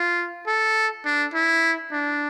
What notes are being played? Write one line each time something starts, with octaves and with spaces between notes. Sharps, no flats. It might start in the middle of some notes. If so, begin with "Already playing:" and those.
Already playing: F4
A4
D4
E4
D4